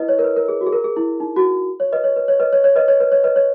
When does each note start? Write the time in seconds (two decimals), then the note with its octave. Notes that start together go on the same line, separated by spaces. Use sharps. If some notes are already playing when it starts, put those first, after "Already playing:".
Already playing: E4 B4 D#5
0.09 C#5
0.19 A#4
0.24 B4
0.37 A#4
0.48 G#4
0.61 F#4
0.67 G#4
0.72 A#4
0.84 G#4
0.97 E4
1.20 D#4
1.36 F#4
1.80 C#5
1.93 B4 D#5
2.04 C#5
2.16 B4
2.28 C#5
2.40 B4 D#5
2.53 C#5
2.64 C#5
2.76 B4 D#5
2.88 C#5
3.00 B4
3.12 C#5
3.24 B4 D#5
3.36 C#5